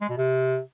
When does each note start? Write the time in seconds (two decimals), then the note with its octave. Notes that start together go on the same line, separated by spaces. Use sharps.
0.01 G#3
0.09 B2
0.18 C3